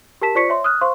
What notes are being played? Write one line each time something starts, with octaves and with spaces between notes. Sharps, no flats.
G4 A#4 A5 B6 E7
F4 C5 D5 C#6 B6 C#7
C#5 E5 C6
D#6 F6 F#6
C5 F5 C6 C#6